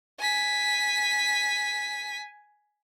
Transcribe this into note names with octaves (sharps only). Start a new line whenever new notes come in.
G#5 B6